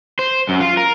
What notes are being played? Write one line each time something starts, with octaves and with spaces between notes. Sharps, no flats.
C5
F#2
F4
A#4